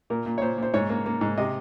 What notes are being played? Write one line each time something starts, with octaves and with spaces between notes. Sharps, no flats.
A#2 A#4
A#2
C#5
A#2 C5
A#2 C5
G#2 C#5
A#3
A#3
G#2
C3 D#5